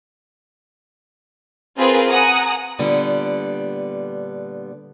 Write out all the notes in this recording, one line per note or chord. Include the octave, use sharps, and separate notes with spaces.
C4 F4 G#4 A#4 B4
F#5 G#5 A#5 D#6
A#2 D3 G3 B3